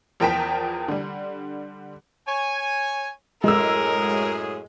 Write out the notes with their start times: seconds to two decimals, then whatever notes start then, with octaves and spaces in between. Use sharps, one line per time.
0.20 E2 F3 A#4 G5 A5 B6
0.88 D3 G3
2.27 C#5 G#5
3.44 F#2 A2 G#3 G#4 A#4 E6